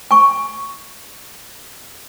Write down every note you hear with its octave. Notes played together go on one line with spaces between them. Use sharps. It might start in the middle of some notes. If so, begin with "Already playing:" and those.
G#5 C#6